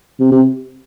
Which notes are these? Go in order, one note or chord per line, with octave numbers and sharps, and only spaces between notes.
C3
C3